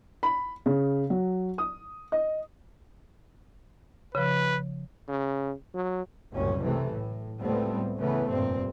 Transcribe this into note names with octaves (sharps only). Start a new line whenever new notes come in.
B5
C#3
F#3
D#6
D#5
C#3 F3 B4
C#3
F#3
F#1 C2 F#2 A2 C#4
C3 E3 A3
A2
C#2 A2 G3 A3 B3 C4
C#3 E3 A3 B3
F1 G2 A#2 C4